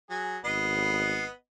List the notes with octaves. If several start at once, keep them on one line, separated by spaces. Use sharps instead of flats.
F#3 G#4
G#1 B3 B4 D#5 C7